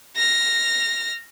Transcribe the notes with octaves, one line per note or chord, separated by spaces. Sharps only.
F6 A#6